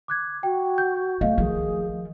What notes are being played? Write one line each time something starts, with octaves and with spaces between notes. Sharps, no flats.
D6 F#6 G#6
F#4 G5
G6
A3 D#5 F5
D#3 F3 G#4